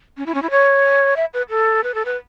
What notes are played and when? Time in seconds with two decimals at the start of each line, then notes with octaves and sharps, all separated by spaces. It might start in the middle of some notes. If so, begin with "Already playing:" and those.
0.17 C#4
0.26 E4
0.34 C#4
0.42 E4
0.51 C#5
1.16 E5
1.34 B4
1.50 A4
1.83 B4
1.95 A4
2.05 B4